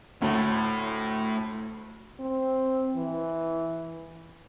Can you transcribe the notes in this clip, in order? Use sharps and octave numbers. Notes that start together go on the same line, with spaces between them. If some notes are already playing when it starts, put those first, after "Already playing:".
D2 A2
C4
E3